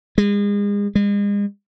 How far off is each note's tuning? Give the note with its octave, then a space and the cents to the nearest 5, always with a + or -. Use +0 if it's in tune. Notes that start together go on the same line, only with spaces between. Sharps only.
G#3 -35
G#3 -40